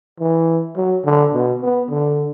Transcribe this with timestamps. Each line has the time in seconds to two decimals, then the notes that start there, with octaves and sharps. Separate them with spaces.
0.20 E3
0.77 F#3
1.05 D3
1.34 B2
1.62 B3
1.89 D3